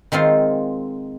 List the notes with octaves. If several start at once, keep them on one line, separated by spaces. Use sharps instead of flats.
D#3 G#3 C4 F4